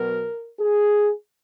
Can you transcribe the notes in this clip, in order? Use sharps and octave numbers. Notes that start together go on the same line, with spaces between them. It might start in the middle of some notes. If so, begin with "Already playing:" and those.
Already playing: B2 F#3 B3 A#4
G#4